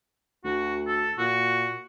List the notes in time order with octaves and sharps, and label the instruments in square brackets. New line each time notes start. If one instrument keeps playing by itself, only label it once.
[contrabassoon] D2 [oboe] F#4
[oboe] A4
[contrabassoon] A#2 [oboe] F#4